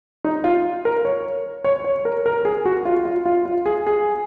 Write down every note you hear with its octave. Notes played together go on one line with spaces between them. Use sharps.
D#4
F4
A#4
C#5
C#5
C#5
A#4
A#4
G#4
F#4
F4
F4
F4
F4
G#4
G#4